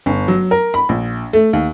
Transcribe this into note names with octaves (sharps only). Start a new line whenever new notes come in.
G1
F#3
A#4
B5
A#1
A3
D#2